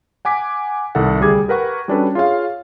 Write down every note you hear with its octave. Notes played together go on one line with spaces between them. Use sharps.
F#5 G#5 D6 B6
C2 D#3 E4 A4 F#5
D2 G3 G4 G#4 D6 G#6
G4 A#4 B4 F#5 C#6
G3 C#4 D4 F#4 A4 B4
F4 G#4 C#5 F5